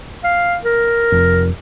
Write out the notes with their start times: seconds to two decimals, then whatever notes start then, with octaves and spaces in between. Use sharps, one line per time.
0.24 F5
0.65 A#4
1.12 F1